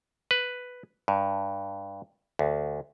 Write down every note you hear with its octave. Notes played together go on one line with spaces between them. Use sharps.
B4
G2
D2